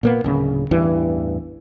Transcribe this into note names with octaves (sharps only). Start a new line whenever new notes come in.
A#2 A#3 B3
D1 C#3
A1 E2 G2 E3